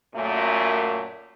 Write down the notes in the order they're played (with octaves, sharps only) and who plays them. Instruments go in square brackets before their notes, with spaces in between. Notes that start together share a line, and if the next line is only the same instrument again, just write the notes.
[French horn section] F#2 A#2 A3